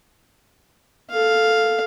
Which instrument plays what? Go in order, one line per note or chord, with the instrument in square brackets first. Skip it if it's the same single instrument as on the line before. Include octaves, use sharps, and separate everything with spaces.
[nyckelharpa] A4 F5